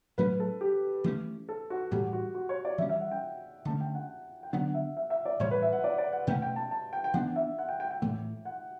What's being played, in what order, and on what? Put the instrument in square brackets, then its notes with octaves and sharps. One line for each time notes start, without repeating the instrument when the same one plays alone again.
[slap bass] A2 F#3 A3 C#4 [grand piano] B4
[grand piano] A4
G4
[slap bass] E3 A3 C#4
[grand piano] A4
F#4
[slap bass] A2 E3 G3 [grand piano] G4
[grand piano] F#4
F#4
C#5
D5
[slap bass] E3 G3 C#4 [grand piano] E5
[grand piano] E5
F#5
G5
[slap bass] D3 A3 C#4 [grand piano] A5
[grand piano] G5
F#5
G5
[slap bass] D3 F#3 B3 D4 [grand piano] F#5
[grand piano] E5
E5
E5
D5
[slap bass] A2 E3 G3 [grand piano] C#5
[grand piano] B4
E5
F#5
D5
D5
F#5
[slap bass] B2 A3 C#4 [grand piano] G5
[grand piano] G5
A5
A5
G5
G5
[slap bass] E3 B3 D4 [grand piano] F#5
[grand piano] E5
F#5
G5
G5
G5
[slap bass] A2 E3 A3
[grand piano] F#5